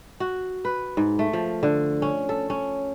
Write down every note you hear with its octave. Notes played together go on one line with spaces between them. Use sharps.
F#4
B4
G#2
A3
F3
D3
C#4
A4
C#4